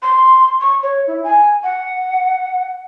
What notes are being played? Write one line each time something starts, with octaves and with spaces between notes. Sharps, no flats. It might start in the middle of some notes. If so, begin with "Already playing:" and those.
C6
C#6
C#5
E4
G#5
F#5